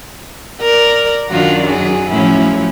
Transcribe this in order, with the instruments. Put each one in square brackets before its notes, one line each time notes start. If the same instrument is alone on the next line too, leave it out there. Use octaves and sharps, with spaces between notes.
[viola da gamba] A#4 D5
[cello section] F#2 D#3 D4 [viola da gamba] F4 F#4
[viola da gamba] F#3 G#4
[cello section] A2 F3 [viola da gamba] F#3 C#4 E4